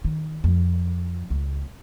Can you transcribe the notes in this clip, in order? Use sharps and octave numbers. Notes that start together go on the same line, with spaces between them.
D#3
F2
C#2